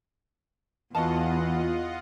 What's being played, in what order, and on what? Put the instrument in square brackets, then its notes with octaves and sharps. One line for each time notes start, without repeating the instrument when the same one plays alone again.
[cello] E2 [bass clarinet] E3 [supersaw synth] F4 D#5 F#5 [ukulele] F#4 A5